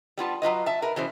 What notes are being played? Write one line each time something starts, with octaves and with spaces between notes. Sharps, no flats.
G3 B3 F4 A5
F#3 F4 B4 D#5
E5 A5
A#4 B4
B2 E3 C#4 C5